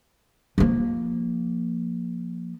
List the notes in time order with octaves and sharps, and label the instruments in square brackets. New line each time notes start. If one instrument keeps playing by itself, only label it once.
[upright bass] F3 A#3